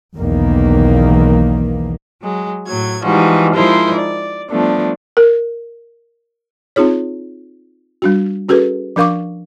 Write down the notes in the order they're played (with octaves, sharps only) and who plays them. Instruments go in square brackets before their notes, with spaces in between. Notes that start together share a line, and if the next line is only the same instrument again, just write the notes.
[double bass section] B1 E2 D#3 A#3
[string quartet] F#3 G#3
A2 F#3 G#6
E3 F3 G3 G#3 D#4 F#4
F3 G#3 D#4 E4 A#4 C5
D5
F3 G3 A3 B3 D4
[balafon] A#4
C4 D#4 F4 G#4 C#5
G3 D4 F#4
C#4 F#4 G#4 A4 B4
F3 D4 A#4 F5 C#6 D6